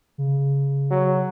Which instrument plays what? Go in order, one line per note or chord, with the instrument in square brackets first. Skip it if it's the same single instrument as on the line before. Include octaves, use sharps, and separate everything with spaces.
[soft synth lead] C#3
[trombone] F#3